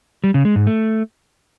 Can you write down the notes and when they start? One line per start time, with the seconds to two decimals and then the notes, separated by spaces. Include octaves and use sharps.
0.24 G3
0.34 C#3
0.45 G#3
0.56 G#2
0.66 A3